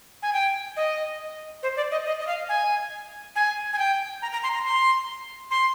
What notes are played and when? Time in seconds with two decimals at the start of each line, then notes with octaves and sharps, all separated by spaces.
0.22 G#5
0.33 G5
0.77 D#5
1.63 C5
1.77 D5
1.91 D#5
2.06 D#5
2.20 D#5
2.27 F5
2.49 G#5
3.36 G#5
3.73 G#5
3.78 G5
4.22 A#5
4.33 A#5
4.43 C6
4.54 A#5
4.65 C6
5.51 C6